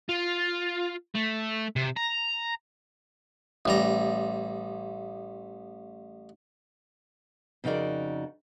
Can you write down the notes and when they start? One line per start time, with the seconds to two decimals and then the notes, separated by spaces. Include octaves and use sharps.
0.09 F4
1.15 A3
1.76 C3
1.97 A#5
3.65 A1 G3 A#5
7.64 F2 C#3 D#4 F#4 A#4 D5